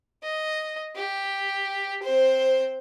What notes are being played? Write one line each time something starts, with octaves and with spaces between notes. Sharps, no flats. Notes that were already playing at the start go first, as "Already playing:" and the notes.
D#5
G4
C4 C5